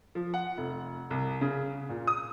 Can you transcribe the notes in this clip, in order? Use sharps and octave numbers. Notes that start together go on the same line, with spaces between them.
F3
F#5
F1
C2
C#3
A#2
D#6